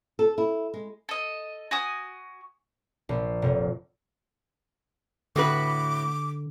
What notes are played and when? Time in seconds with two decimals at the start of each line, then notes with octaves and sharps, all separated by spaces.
0.19 A4
0.38 E4
0.74 G#3
1.09 A4 D#5
1.71 F#4 G#5 D#6
3.09 A#1
3.42 F1
5.36 A2 D3 F#4 B4 D6